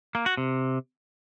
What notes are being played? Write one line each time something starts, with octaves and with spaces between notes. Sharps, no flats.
A#3
F#4
C3